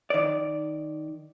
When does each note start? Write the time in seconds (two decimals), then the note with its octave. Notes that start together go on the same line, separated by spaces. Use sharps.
0.10 D#3 D5